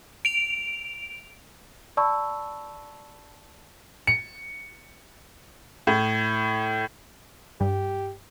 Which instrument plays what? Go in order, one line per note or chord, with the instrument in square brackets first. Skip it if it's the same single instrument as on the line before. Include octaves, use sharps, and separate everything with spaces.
[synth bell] D7 F7
[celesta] D5 A5 B5 C#6 E6
[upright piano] C#7
A2
[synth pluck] G2 [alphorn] G4